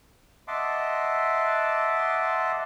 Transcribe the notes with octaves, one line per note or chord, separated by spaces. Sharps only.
D#5 E5 F#5 A5 C6 D6